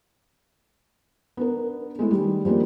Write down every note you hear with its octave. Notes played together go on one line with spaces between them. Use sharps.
B3 D4 A#4
G#3 A3 E4
D#3 G3
F3 G3 G#3 A#3 D4